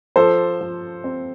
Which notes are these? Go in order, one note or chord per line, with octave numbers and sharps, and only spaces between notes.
F3 A4 C5
F3
C4